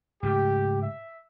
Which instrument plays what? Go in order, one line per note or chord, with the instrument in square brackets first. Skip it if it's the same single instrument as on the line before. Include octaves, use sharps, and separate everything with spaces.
[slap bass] G#2 C#3 A3 [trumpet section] G4
[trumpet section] E5